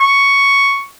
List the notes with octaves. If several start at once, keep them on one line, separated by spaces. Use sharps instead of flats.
C#6